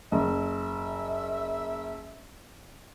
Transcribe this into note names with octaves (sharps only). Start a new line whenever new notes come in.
F#1 E5